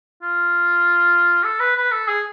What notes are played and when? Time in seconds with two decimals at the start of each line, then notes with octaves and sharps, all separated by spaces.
0.22 F4
1.44 A4
1.60 B4
1.76 B4
1.91 A4
2.08 G#4